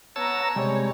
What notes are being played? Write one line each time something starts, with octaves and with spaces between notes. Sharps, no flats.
B3 C#5 A5 A#5 E6
C3 G3 G#3 C#5